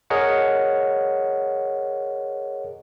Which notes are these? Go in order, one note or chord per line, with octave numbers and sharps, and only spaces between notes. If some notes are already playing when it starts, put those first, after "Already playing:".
G#4 A#4 C#5 D#5 F#5